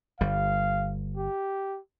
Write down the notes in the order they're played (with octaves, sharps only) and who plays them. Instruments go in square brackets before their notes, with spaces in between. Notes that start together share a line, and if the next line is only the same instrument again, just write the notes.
[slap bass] G1 G3 [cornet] F5
[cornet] G4